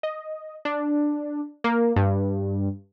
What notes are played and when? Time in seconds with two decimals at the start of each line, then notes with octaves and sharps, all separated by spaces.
0.03 D#5
0.65 D4
1.64 A#3
1.96 G2